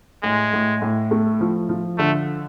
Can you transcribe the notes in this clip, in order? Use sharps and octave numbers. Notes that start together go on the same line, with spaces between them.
A2 G#3
A2
A2
A3
F3
F3
D3 A3